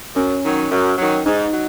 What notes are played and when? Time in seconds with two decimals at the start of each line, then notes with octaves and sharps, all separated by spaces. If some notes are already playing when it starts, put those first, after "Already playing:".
0.15 F#2 C#4
0.44 D#3 F#3
0.71 F#2
0.98 D#3 F#3
1.25 G#2 D#4
1.53 F#3